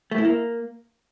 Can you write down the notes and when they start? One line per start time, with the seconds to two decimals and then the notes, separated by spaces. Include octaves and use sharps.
0.11 A3
0.18 E4
0.25 A#3